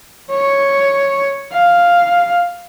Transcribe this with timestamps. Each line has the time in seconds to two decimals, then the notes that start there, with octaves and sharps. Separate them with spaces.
0.31 C#5
1.52 F5